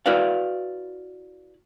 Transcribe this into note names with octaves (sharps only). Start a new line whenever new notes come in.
E4 F#4 B4 D5 F5